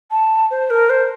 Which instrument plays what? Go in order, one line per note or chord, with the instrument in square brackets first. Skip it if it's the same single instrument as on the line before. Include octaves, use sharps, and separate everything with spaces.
[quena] A5
C5
A#4
C5